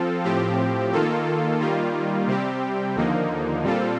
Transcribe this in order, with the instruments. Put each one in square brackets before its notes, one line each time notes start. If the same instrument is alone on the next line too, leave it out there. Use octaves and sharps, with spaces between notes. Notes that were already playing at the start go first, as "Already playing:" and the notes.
Already playing: [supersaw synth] F3 C4 F4 A4
A2 F3 C4 G4
D#3 A#3 F4 A4
D#3 G3 A#3 F4
C3 G3 C4 G4
D#2 D3 F3 A#3 D#4
A#2 G3 C4 F4 A4